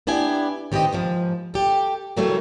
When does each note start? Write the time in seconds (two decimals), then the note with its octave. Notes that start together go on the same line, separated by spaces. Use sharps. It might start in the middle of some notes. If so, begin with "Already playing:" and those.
0.07 B3 D4 E4 G4 G#5
0.72 D#3 C4 G4 B4 D#5
0.93 D#2 G#2 F3
1.54 G4 A4
2.17 C#3 E3 F#3 G3 A3 A#3